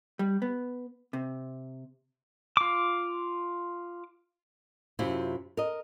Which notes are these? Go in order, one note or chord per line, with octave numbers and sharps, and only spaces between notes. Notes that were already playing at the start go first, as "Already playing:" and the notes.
G3
B3
C3
F4 D6
F#2 C3 E4 F4
A#4 D#5